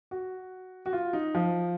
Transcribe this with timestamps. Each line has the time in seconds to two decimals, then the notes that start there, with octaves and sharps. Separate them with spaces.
0.11 F#4
0.86 F#4
0.93 F4
1.13 D#4
1.35 F3